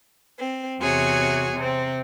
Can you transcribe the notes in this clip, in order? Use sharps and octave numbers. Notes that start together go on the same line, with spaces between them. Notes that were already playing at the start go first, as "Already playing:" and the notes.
C4
E2 C3 F#4 G#4 C#5
C3 C4